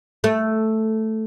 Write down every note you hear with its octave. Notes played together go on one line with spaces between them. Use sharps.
A3